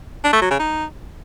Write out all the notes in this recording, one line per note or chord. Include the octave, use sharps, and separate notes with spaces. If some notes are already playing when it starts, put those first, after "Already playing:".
D4
A3
F#3
C#3
D#4